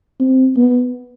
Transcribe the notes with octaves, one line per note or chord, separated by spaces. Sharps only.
C4
B3